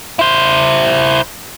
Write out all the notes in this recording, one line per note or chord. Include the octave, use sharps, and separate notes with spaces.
E4 C5